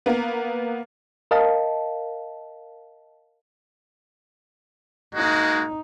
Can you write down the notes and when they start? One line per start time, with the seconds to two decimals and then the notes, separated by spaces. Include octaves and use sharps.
0.06 A#3 B3
1.31 A#4 D#5 F5 A5
5.15 G#3 A#3 D#4 F#4